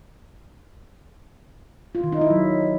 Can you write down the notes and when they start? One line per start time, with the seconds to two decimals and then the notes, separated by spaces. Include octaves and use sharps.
1.95 F4
2.04 D#3
2.12 D#4
2.21 E4
2.30 F#3